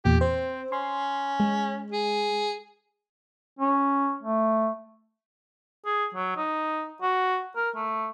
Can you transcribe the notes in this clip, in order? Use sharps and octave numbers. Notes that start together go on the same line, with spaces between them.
E2 A#2 G4
C4 C5
C#4 C6
G#3
G#4
C#4
A3
G#4
F#3
D#4
F#4
A#4
A3